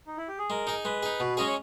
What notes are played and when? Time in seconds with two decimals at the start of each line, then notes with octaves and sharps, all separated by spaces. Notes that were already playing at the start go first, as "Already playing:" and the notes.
0.07 D#4
0.17 E4
0.28 G4
0.39 G#4
0.50 G#3 A#4
0.67 D#4 G#4
0.85 G#3 B4
1.03 D#4 G#4
1.20 B2
1.37 G#3 C#4 G#4 D#5
1.47 C#5